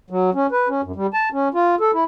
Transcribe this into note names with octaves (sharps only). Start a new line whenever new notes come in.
F#3
C#4
B4
C#4
F#2
G3
A5
C#4
F4
A4
E4